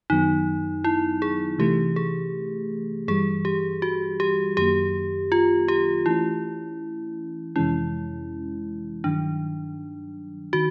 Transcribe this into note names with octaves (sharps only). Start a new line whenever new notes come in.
F#2 D#3 F#3 B3 D#4
E4
G#4
C3 E3 A3 G4
G#4
G2 E3 G3 G#4
G4
F#4
G4
F#2 D#3 F#3 A#3 G4
F4
G4
E3 A3 C#4 E4
F2 C3 E3 G#3 C#4 E4
G2 D#3 F#3 D4
D#3 F#4